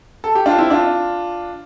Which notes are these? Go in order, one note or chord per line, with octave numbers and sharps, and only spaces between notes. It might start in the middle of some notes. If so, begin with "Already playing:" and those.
A4
G4
D4 F4
C4 E4
D4 F4